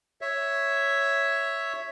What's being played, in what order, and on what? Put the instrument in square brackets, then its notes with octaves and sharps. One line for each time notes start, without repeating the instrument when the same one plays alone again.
[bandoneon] C#5 E5